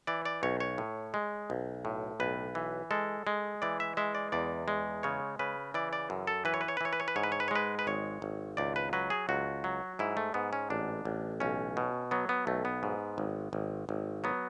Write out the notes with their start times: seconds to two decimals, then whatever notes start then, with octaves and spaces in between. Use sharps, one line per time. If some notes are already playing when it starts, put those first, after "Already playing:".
0.07 E3 D5
0.25 D5
0.43 B1 C#5
0.60 C#5
0.78 A2
1.14 G#3
1.50 B1
1.85 A2
2.20 B1 B4
2.55 E3
2.91 G#3 A4
3.27 G#3
3.62 E3 D5
3.80 E5
3.97 G#3 E5
4.15 D5
4.32 E2 D5
4.68 G#3
5.03 C#3 C#5
5.39 C#3 B4
5.74 E3 D5
5.93 D5
6.10 F#2
6.27 A4
6.45 E3 B4
6.54 C#5
6.61 B4
6.68 C#5
6.77 B4
6.81 E3 C#5
6.93 B4
7.00 C#5
7.08 B4
7.16 G#2 C#5
7.23 B4
7.32 C#5
7.40 B4
7.48 C#5
7.51 G#3 B4
7.79 B4
7.87 G#1 C#5
8.22 G#1
8.57 C#2 D5
8.76 B4
8.93 F#3 B4
9.10 G#4
9.29 C#2 F#4
9.64 F#3
9.99 G#2 E4
10.17 A3
10.34 G#2 B3
10.53 C#4
10.70 A1 D4
11.05 A1
11.40 B1 C#4
11.77 B2
12.11 F#3 B3
12.29 B3
12.47 B1 A3
12.65 B3
12.83 G#2
13.18 G#1
13.53 G#1
13.89 G#1
14.24 F#3 B3